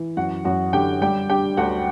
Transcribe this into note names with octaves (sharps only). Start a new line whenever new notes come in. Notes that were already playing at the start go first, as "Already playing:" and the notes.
Already playing: E3
F#2 F#4 F#5
F#2 F#4 F#5
D3 G4 G5
G3 G4 G5
D4 G4 G5
D2 F#4 F#5